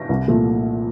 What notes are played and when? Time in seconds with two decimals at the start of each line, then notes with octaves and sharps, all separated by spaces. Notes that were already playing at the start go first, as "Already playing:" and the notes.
Already playing: A#6
0.09 C2
0.28 A#2 F3 A3